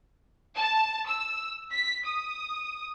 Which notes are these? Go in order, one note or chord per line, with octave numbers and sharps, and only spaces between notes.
A5
E6
B6
D#6